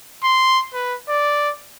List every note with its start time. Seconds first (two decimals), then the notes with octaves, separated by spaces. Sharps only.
0.24 C6
0.74 B4
1.09 D5